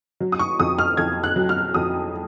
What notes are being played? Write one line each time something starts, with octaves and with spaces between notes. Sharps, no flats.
F#3
D#6
C#6
F2 D#6
F6
F2 G#6
F#6
F#3
F6
F2 D#6